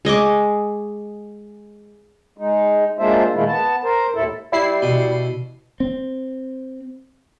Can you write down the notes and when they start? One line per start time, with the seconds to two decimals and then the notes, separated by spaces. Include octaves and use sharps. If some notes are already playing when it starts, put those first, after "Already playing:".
0.05 G#3 D#5 C#6 D6
2.38 G#3 D#4
2.99 G#3 A#3 D4 F4 C5 E5
3.35 A#2 D#3 G#3 A3 E4 F4
3.48 B3 A5
3.83 A#4 C5
4.14 D#2 A2 E4 A4
4.53 G3 E4 C7
4.82 B2
5.80 C4